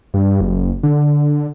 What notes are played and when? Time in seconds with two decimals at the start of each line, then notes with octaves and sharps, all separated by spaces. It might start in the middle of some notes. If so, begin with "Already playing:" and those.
0.14 G2
0.41 F#1
0.83 D3